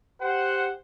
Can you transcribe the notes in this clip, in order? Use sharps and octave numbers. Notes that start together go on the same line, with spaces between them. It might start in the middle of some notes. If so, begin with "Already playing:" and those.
G4 C5 F#5